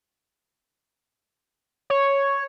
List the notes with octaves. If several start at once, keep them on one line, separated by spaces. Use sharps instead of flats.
C#5